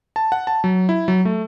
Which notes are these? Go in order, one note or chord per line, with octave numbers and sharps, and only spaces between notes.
A5
F#5
A5
F#3
E4
F#3
A3